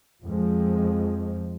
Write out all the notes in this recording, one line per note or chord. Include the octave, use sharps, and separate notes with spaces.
F2 F3 G#3